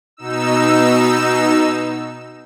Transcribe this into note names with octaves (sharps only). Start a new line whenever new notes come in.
B2 D#4 E6